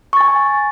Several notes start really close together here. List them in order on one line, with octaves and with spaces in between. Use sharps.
C#6 A6 G#5